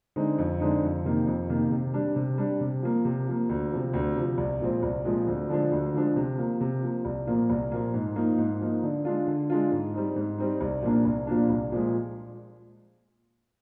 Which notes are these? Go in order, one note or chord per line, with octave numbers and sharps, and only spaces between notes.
D3 G#3 C4 D#4
F2
D3 G#3 C4 D#4
F2
C3 D#3 A#3
F2
C3 D#3 A#3
C3
G3 D4
C3
G3 D4
C3
F3 A#3
C3
F3 A#3
D2
C3 F3
D2
C3 F3
C2
A#2 F3 G#3 C4
C2
A#2 F3 G#3 C4
D2
D3 F3 G#3 D4
D2
D3 F3 G#3 D4
C3
F3 A#3
C3
F3 A#3
C2
A#2 F3 A#3
C2
A#2 F3 A#3
G#2
F3 A#3 D#4
G#2
F3 A#3 D#4
D3
G#3 D4 F4
D3
G#3 D4 F4
G#2
G3 C4 D#4
G#2
G3 C4 D#4
C2
A#2 F3 A#3 D4
C2
A#2 F3 A#3 D4
C2
A#2 F3 G#3